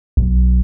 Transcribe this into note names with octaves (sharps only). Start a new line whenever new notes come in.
B1